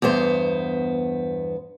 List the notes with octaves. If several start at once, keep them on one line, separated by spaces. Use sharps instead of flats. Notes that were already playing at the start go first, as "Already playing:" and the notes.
E2 G2 B3 C5